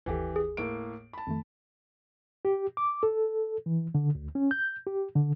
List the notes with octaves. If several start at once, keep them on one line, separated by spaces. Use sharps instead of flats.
G1 D#2 E3 G4 A4
G#4
A2 A#3 D7
A5 B5
F2 D#3 A3
G4
D6
A4
E3
D3
D2
C#4
G6
G4
D3